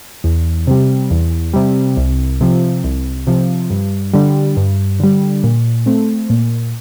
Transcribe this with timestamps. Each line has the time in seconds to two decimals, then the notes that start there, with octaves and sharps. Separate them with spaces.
0.24 E2
0.67 C3 G3
1.11 E2
1.53 C3 G3
1.97 C2
2.41 C3 F3
2.84 C2
3.27 C3 F3
3.70 G2
4.13 D3 G3
4.57 G2
5.00 D3 G3
5.43 A#2
5.86 A3 C4
6.30 A#2